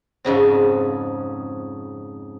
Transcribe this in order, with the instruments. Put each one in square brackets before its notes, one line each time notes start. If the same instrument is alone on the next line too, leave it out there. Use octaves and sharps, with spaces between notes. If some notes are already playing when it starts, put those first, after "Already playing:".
[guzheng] F2 G#2 C#3 C4